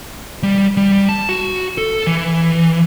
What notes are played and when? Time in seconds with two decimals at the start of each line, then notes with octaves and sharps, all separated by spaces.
0.43 G3
0.77 G3
1.09 A5
1.29 F#4
1.78 A4
2.07 E3